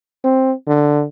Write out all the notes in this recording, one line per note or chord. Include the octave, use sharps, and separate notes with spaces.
C4
D3